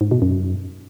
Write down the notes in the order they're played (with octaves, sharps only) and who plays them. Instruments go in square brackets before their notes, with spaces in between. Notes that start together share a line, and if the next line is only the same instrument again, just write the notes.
[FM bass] G#2
B2
F#2